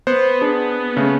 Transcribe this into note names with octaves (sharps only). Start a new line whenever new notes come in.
B3 C5
D4 G#4
C#3 A3